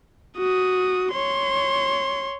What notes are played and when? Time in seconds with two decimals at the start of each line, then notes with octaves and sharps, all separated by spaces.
0.38 F#4 D#6
1.12 C#5 C6